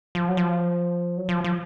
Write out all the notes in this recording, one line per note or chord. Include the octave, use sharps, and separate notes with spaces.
F3
F#3
F3
F#3
F3
F3